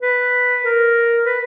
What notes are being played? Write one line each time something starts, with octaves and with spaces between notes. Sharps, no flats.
B4
A#4
B4